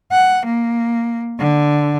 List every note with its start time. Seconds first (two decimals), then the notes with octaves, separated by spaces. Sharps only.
0.11 F#5
0.45 A#3
1.39 D3